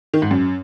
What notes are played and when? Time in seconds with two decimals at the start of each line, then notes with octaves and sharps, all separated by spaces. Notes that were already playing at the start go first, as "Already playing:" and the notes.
0.14 D#3
0.22 G#2
0.31 F#2